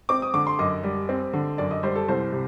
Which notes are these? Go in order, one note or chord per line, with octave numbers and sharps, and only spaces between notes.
C4 D6
D#6
D3 D6
C6
F#2 D#5
G3
C4
D3
F#2 D5
D#5
G3 C5
A4
C2 C5
C3